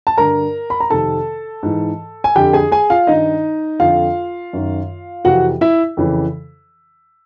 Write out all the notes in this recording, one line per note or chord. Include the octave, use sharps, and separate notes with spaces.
A5
G2 D3 A#4 A#5
B5
A#5
F2 C3 D#3 A4 A5
G#2 E3
G#5
F2 D3 G4 G5
G#4 G#5
G#4 G#5
F4 F5
G2 D#3 D#4 D#5
F2 D3 F4 F5
F#2 D#3
F2 C3 E3 F#4 F#5
E4 E5
F2 C#3 E3